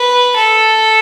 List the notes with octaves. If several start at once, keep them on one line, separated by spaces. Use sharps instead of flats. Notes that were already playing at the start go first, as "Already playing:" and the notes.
Already playing: B4
A4